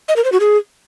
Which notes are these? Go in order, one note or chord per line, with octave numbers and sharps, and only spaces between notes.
D#5
A#4
C5
F#4
G#4